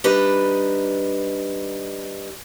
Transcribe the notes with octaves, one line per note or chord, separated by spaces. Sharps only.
G3 D4 D#4 B4